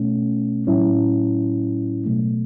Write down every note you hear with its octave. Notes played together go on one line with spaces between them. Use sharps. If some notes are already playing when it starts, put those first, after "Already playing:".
Already playing: B2 A3 C#4
A2 F#3 C#4 E4
B2 F#3 A3